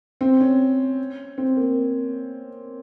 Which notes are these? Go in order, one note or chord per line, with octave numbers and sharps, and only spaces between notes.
C4
C#4
C4
A#3